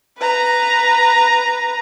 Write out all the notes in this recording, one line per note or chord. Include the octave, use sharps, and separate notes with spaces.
B4 A#5